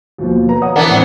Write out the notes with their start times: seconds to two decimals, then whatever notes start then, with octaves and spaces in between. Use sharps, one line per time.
0.18 D#2 B2 F3
0.49 B4 A#5
0.61 C#5 F#5 D#6
0.76 E3 B3 D4 A#4
0.90 A2 C4